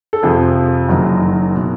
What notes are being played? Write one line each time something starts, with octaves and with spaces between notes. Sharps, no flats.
A4
F2 C3 F3 G#4
F#1 F#2 D#3 F#3
B2